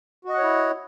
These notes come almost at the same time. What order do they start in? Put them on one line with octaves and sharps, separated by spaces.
F#4 D#5 F#5 C#5 E4